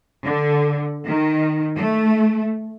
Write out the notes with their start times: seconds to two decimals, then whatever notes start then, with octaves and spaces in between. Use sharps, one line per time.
0.25 D3
1.07 D#3
1.77 A3